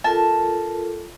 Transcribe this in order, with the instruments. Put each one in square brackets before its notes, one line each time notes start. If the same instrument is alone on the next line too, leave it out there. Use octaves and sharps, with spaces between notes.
[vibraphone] F4 A4 A#4 [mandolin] A5